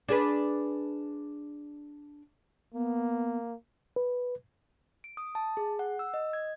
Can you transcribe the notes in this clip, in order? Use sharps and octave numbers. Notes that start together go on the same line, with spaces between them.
D4 G#4 B4
A#3 B3
B4
D7
D#6
A5
G#4
F#5
E6
D#5
G#6